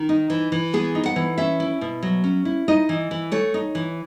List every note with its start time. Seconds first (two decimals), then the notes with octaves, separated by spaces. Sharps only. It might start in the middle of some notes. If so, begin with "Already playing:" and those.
Already playing: D#3
0.09 D#4
0.30 E3
0.52 E3
0.74 B3 G#4
0.95 D#4
1.06 F#5
1.16 E3
1.38 C#4 E5
1.60 E4
1.81 B2
2.03 F#3
2.24 C#4
2.45 E4
2.68 D#4 D#5
2.89 E3
3.11 E3
3.32 A3 C#5
3.54 D#4
3.75 E3